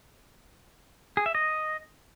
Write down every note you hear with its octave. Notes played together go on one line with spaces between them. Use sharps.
G#4
E5
D#5